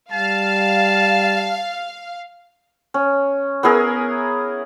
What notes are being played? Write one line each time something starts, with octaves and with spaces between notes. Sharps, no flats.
G3 F5 A5
C#4
B3 E4 G#4 A#4